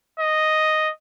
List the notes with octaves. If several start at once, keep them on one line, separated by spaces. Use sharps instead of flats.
D#5